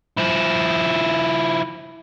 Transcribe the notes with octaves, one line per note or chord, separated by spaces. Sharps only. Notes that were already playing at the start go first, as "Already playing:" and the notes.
F3 E4